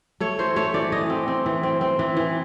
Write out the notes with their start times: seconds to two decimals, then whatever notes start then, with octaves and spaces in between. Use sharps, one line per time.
0.20 A3 C#5
0.39 E3 C5
0.56 A3 C#5
0.74 E3 D5
0.92 E3 D#5
1.10 C4
1.28 C4
1.46 E3
1.63 C4
1.81 C4
1.99 E3
2.17 E3